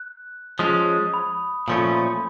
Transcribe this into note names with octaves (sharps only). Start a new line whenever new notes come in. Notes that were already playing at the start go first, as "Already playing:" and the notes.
Already playing: F#6
F3 G#3 C#4 D#6
B5
A#2 F3 A3 C#4 B5
B5